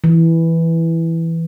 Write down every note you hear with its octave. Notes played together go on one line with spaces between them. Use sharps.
E3